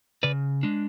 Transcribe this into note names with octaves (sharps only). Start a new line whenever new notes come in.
C#3 B4 D5
G#3 D4